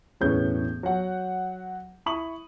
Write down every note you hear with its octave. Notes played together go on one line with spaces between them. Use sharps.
E1 A2 C#4 G#4 B4 G6
F#3 F#5
E4 B5 C#6 D#6 F#7